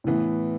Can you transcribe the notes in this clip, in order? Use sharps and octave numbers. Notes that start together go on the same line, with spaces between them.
A2 E3 B3